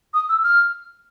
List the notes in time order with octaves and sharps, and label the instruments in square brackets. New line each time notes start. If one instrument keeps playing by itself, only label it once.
[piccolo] D#6
E6
F6